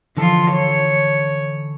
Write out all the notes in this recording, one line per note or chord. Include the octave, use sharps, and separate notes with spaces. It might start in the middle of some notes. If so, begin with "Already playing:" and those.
D3 E3 F3 F4 A4
C#5